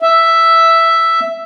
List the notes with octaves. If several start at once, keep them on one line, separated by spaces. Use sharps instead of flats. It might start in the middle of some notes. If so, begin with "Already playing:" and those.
E5